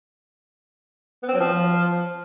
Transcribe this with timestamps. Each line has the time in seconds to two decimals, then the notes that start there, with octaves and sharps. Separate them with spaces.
1.23 B3
1.28 C4
1.34 F#3
1.40 F3